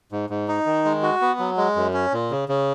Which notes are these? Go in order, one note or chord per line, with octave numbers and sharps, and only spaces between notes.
G#2
G#2
D#4
D#3
G#3
F#4
B3
F#3
G#3
F#2
C#4
A#2
C#3
C#3